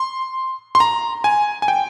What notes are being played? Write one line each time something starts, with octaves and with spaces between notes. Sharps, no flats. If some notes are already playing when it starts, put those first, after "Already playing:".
Already playing: C6
C6
A#5
G#5
G#5
G5